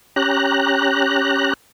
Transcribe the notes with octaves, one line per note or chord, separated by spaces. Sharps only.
C#4 G4 A#5 F#6